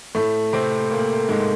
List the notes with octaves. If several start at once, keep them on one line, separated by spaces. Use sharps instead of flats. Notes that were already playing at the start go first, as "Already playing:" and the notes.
A2 A3
C3 C4
A#2 A#3
G#2 G#3